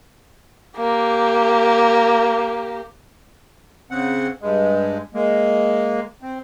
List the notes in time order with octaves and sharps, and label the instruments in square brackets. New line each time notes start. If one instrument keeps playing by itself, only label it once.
[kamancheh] A#3 G4
[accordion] C#3 C4 F#5
G2 G#3
G#3 A#3
C4